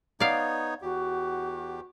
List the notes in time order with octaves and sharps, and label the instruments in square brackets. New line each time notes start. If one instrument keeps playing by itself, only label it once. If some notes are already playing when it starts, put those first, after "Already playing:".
[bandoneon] B3 D#4 C#5 [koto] D5 F5
[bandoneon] E2 G4 [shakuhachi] F#4